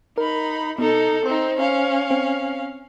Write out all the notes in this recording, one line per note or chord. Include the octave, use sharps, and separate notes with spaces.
D#4 A#4 B5
B2 D#4 A4
C4 D#4 C5
C#4 F5
C4